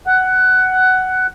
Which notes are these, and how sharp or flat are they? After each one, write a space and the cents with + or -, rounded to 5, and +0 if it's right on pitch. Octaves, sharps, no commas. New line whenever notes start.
F#5 +10